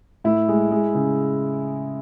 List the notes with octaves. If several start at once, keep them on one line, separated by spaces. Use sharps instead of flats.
A2 E4
G#3
G#3
C#3